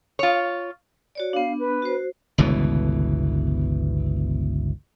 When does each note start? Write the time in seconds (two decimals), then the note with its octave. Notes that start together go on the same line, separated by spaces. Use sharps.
0.19 F4 C#5
1.15 F#4 C#5 D5
1.33 B3 D4 F5
1.59 B4
1.82 F#4 C5
2.38 G1 C#2 B2 E3